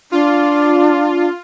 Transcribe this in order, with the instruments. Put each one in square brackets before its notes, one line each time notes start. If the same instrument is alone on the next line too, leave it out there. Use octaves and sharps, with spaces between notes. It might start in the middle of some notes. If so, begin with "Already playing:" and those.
[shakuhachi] D4 [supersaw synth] F4